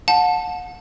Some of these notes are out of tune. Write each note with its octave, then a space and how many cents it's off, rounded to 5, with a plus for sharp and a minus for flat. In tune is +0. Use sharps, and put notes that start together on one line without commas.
F#5 -35 A5 +0